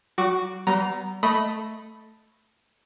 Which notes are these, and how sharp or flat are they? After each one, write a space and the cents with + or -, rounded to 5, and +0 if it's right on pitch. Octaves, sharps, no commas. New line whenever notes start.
F#3 +40 F#4 -5 D6 +0
G3 -35 B3 +0 A#5 +0
A3 +0 D#5 +10 B5 +0